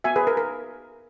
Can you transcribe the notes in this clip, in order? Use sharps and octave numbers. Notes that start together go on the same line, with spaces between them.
B3 F#4 E5 G#5
G#4 B4
A#4
A#4